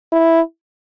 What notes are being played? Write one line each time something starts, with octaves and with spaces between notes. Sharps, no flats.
E4